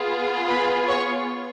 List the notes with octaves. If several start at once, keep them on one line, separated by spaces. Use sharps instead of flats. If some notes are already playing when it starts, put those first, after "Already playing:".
Already playing: B3 F4 G#4
B4 B5
C#5 C#6